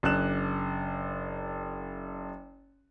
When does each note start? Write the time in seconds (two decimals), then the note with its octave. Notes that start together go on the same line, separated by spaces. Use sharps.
0.03 F#1 D4 F#6 E7